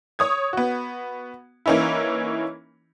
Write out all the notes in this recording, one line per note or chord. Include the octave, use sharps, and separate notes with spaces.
C#5 D#6 G#6
B3 F#4
E3 A#3 C#4 D#4 E4